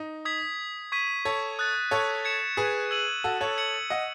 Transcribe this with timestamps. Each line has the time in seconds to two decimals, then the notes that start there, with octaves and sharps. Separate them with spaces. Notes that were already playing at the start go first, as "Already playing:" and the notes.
Already playing: D#4
0.25 D#6 G#6 B6
0.92 C#6 G#6 B6 D#7
1.25 A4 C#5
1.59 D#6 F#6 A6
1.91 A4 C#5
2.25 G#6 C#7 E7
2.57 G#4 B4
2.91 E6 G#6 D#7 F#7
3.24 F#4 A4
3.41 A4 C#5
3.58 G#6 C#7 F#7
3.90 D#5 F#5